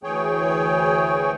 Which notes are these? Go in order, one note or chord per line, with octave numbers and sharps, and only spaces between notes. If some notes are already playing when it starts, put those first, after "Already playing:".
D2 E3 G#4 C#5 G5